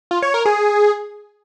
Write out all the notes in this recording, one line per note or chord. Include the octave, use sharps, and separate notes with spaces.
F4
C#5
A#4
G#4